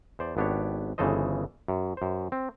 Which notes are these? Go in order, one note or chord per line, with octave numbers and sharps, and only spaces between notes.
E2 C5 D5
G#1 B3 D4 G4 C#5
G1 C#3 E3 A4 C5 D#5
F#2
F#2 C5
C4